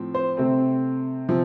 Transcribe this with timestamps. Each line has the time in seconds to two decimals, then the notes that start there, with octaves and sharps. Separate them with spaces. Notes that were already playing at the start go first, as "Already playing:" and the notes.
Already playing: A2 F3 C4
0.14 C5
0.37 C3 A3 C4
1.29 C3 F3